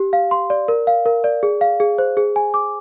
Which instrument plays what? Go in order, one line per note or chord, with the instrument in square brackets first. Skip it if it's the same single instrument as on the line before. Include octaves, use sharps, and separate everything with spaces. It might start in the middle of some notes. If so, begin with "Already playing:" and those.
Already playing: [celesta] G4
F5
C6
D5
A#4
F5
A#4
D5
G#4
F5
G#4
C5
G#4
G#5
D6